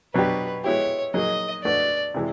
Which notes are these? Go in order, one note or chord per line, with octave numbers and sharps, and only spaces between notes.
B2 F#3 B3 D4 G4 B4
G#3 B3 E4 G4 C#5
F#3 A#3 D#4 G#4 D#5
A3 D4 F#4 B4 D5
C3 E3 G#3